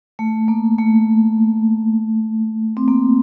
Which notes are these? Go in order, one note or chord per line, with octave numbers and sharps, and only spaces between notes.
A3
A#3
A3
C4
A#3